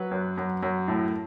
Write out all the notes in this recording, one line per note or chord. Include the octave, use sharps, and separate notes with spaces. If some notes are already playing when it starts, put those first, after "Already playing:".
Already playing: F#3 B4
F#2
F#2
F#2
A2